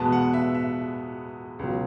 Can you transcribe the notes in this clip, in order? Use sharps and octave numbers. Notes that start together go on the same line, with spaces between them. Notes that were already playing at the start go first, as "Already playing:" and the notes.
Already playing: E2 B2 G#3 B3 A5
F#5
E5
E5
C#2 B2 F#3